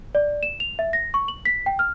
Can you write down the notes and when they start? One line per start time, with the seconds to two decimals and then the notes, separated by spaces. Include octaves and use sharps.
0.15 D5
0.43 E7
0.60 F7
0.79 E5
0.93 A#6
1.14 C#6
1.28 F#7
1.45 B6
1.66 G5
1.79 F6